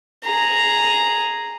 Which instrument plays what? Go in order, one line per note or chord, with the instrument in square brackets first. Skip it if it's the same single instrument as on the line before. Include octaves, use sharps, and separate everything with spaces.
[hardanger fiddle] G#4 A#5